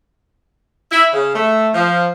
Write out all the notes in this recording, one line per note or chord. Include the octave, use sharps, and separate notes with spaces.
E4
C#3
A3
F3